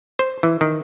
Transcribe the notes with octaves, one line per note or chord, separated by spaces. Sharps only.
C5
E3
D#3